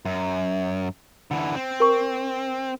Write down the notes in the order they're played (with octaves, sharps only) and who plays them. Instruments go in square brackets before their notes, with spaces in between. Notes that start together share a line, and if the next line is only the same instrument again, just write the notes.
[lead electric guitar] F#2
D3 E3
C4
[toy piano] A#4 C#6